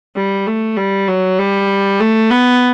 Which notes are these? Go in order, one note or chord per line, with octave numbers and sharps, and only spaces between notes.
G3
A3
G3
F#3
G3
A3
B3